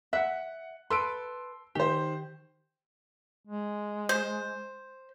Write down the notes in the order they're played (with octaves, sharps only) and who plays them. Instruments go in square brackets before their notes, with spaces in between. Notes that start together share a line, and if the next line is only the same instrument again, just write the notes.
[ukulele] E5 [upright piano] F#5 F#6
[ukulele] A4 B4 [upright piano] C6 E6 D7
[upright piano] D#3 C5 [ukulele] G4
[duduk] G#3
[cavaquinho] C5